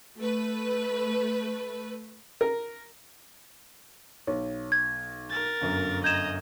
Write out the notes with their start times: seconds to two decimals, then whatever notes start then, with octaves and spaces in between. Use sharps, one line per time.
0.18 A3 B4
2.41 A#4
4.27 B1 C#5
4.72 G#6
5.30 A#4 A6
5.61 G1 F#2
6.04 D#5 A#5 G6 G#6 E7